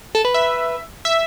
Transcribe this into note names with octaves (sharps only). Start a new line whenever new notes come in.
A4
B4
E5
E5